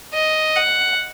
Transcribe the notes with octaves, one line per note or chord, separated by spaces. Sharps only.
D#5
F#5